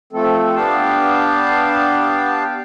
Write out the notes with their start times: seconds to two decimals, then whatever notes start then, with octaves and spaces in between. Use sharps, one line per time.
0.13 F3 A3 C4 A4
0.56 B3 D4 G4 F5 G5 A5